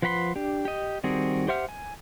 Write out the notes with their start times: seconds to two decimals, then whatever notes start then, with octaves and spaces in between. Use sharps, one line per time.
0.02 F3 B4 F#5 B5 C6
0.36 D4 G4
0.65 G4 D#5
1.04 D#3 G3 C4 F#4 G#4
1.48 G4 C5 E5 F#5 F6
1.69 G#5